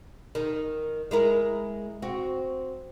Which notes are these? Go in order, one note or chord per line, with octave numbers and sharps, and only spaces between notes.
D#3
G#3 E4 A#4
C4 F#4